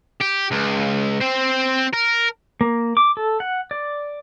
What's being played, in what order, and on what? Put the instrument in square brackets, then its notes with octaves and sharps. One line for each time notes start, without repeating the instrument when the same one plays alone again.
[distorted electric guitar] G4
C#2
C4 C5
A#4
[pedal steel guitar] A#3
D6
A4
F#5
D5